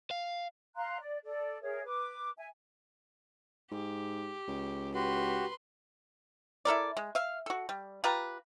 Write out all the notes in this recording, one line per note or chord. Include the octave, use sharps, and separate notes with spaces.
F5
F5 A#5 C6 F#6
D5
A4 D5
G#4 A#4 C#5 E5
B4 D6
E5 G#5
G#2 G4
C#2
F#4 G4 B4 C6
E4 A4 A#4 D5
G#3
E5 F5
F#4 A4
G3
F4 G4 B4 A#5